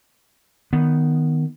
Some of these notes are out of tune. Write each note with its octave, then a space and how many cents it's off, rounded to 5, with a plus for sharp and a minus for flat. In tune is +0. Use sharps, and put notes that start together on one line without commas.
D#3 +0 B3 +0